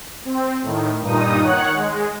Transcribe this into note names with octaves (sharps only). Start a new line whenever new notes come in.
C4
A2 D#3
G2 A#2 D#4 D#6
D#3 C#5 F#5 F#6
G#3